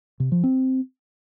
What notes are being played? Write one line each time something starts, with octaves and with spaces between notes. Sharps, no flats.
C3
F3
C4